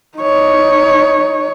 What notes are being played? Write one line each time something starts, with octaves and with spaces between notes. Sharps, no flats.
D#4 C#5